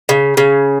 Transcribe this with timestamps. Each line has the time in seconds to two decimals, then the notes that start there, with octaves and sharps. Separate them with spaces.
0.09 C#3
0.37 C#3